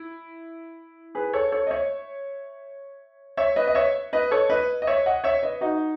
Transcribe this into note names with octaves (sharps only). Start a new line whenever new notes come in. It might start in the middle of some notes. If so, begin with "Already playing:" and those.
Already playing: E4
G#4 B4
A4 C#5
A4 C#5
D#5
C#5 E5
C#5 E5
B4 D#5
D#5
C#5 E5
B4 D#5
A4 C#5
B4 D#5
D#5
C#5 E5
D#5 F#5
C#5 E5
B4 D#5
D#4 F#4